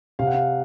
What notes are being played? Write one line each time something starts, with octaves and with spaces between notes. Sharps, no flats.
C3 F5
F#5
F5